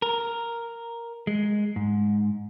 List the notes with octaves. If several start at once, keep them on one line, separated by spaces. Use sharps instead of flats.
A#4
G#3
G#2